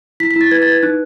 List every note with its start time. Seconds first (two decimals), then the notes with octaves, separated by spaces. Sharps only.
0.20 E4 B6
0.31 B6
0.36 E4 A6
0.51 B4 G#6
0.62 A6
0.67 B4
0.72 G#6
0.83 D#4 F#6